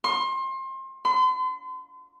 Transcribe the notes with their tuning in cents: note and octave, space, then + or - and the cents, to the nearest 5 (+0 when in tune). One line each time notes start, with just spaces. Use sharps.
C6 +30
C6 -40